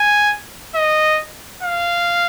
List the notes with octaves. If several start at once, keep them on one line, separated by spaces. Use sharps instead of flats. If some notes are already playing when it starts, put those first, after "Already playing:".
Already playing: G#5
D#5
F5